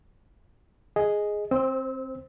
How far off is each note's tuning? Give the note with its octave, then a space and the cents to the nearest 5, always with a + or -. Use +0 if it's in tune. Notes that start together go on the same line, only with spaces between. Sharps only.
G#4 +0 D#5 +0
C4 +15 C5 -15 E6 -30